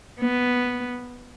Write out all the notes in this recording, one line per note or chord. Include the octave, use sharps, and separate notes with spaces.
B3